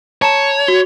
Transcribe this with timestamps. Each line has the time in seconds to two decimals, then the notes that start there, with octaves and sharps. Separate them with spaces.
0.22 C#5 A5 A#5 E7
0.67 F#4 G7